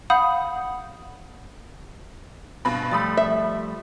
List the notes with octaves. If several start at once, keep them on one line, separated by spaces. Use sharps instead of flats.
F5 F#5 B5 D#6 G6
G2 B2 B5
F3 G3 A3 B5 D#6 A6
E5